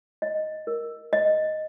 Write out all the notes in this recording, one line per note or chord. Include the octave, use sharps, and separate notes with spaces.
D#5
A#4
D#5